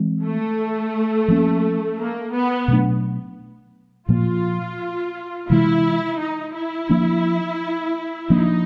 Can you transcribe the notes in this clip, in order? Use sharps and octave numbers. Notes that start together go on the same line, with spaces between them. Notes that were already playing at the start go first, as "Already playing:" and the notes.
Already playing: E3 G#3 C4
A3
F3 A#3 C#4
A#3
B3
B2 F#3 A3 D4
A#2 F3 A#3 F4
C3 E3 G#3 E4
D#4
E4
F3 A#3 D4
F3 A#3 D4 D#4